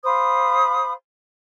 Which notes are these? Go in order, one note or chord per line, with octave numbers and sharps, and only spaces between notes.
C5 F5 B5 D#6